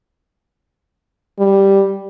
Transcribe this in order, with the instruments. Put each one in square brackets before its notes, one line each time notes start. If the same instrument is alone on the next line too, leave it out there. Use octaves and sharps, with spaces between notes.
[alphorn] G3